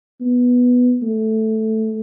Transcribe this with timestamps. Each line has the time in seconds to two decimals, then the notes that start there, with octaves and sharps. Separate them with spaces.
0.21 B3
1.02 A3